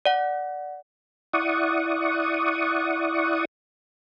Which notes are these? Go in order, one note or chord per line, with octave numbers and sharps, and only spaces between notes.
D5 F#5
E4 D5 F#5 C#6 D#6